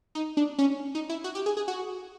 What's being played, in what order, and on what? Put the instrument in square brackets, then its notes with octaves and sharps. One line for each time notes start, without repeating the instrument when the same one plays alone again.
[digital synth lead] D#4
D4
C#4
D#4
E4
F#4
G4
G#4
G#4
F#4